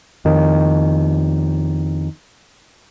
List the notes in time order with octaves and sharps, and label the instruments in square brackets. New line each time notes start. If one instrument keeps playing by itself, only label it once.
[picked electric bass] F2 D#3